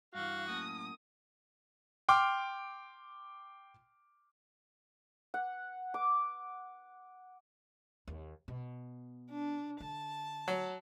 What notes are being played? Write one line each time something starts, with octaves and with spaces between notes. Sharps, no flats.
G2 E3 F#4 F5
F#2 A2 A#3 D#6
G5 C6 D6 F6
F#5
D6
D#2
B2
D4
D3 A5
F#3